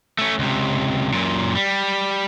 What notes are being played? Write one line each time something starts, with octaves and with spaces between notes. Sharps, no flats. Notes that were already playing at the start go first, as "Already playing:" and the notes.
A3 C#4
C#2 C3
F#2 A#2
G3